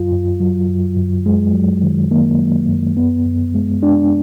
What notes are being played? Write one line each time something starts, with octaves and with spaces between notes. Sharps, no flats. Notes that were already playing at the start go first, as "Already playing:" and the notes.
Already playing: F#2 F#3 F4
F#2
F#3
F#2
F#2
F#2 G#3
F#3
D#3
D#3 A#3
F#3
F#2
F#2 B3
F#2
G#3
G#3 D4